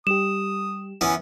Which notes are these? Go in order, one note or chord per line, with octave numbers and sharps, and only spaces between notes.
G3 G4 D#6 E7
E3 B3 C#4